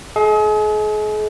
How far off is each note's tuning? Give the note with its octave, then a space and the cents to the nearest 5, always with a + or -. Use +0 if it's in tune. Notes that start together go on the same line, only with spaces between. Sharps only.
G#4 +40 D#5 +30